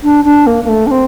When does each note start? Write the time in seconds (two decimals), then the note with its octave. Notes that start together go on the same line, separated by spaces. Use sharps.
0.03 D4
0.25 D4
0.47 A#3
0.65 A#3
0.69 A3
0.87 D4
0.91 C4